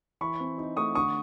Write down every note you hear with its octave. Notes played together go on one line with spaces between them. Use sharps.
E3 B5 C#6
C4
D#4
A3 C#6 D#6
D3 C#6 D#6